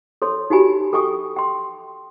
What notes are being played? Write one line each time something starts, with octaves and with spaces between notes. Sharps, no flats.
A4 C#5 C6
D#4 F#4 G4 G#5 B5
A4 G5 G#5 C#6 D#6
G5 C6